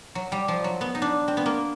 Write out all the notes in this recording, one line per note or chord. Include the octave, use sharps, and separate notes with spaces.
F#3
G3
F3
F#3
B3
D#4
D4
C4
B3
A#3